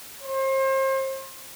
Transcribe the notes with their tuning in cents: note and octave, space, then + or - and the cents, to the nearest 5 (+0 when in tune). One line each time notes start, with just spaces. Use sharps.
C5 +35